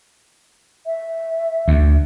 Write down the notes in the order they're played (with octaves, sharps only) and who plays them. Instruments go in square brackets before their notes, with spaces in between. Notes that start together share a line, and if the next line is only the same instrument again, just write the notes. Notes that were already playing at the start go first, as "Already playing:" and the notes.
[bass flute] E5
[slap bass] D2